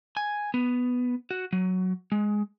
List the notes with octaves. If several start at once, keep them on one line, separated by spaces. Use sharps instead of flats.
G#5
B3
F#4
F#3
G#3